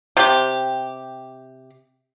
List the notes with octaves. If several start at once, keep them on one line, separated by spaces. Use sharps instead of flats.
C3 G4